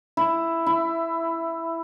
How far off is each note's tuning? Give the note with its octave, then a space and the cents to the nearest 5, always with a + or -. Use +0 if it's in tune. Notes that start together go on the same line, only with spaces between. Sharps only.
E4 +5
E4 +15